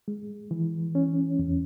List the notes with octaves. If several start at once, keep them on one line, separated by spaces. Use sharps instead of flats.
G#3
E3
C#4
E2